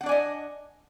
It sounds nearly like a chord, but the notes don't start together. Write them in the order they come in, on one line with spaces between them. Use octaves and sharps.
F#5 D4 D5 G#5 D#5